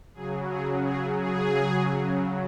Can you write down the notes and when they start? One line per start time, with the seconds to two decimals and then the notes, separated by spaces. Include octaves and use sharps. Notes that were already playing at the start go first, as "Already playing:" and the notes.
0.14 C#3 F#3 G#4
0.50 G#4
0.85 G#4
1.20 G#4